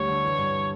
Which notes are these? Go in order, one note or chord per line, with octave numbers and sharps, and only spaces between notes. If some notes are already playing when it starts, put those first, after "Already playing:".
Already playing: D2 G3 C#5
D3
E3
G2